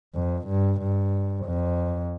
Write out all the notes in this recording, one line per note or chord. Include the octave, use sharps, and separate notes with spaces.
F2
G2
G2
F2